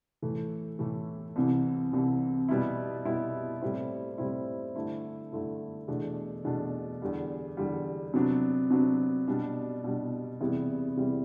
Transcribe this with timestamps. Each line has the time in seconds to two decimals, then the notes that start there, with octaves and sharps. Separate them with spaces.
0.22 A2 E3 A3
0.79 A2 E3 A3
1.36 C2 C3 E3
1.93 C2 C3 E3
2.49 B2 G3 B3 E4
3.05 B2 G3 B3 E4
3.62 A2 G3 C4 E4
4.18 A2 G3 C4 E4
4.76 G2 D3 A3 E4
5.32 G2 D3 A3 E4
5.88 E2 B2 A3 D4
6.44 E2 B2 A3 D4
7.02 E2 D3 G3
7.57 E2 D3 G3
8.14 C3 F#3 B3 D4
8.71 C3 F#3 B3 D4
9.27 B2 G3 D4
9.84 B2 G3 D4
10.41 E2 C3 G3 B3 E4
10.97 E2 C3 G3 B3 E4